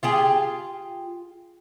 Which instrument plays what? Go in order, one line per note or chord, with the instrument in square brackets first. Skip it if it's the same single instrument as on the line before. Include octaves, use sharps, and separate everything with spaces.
[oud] F4 G4 G#4